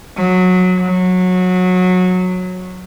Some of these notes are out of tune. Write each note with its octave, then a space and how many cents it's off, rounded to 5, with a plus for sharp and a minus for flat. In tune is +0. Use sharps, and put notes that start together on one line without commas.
F#3 -15
F#3 -20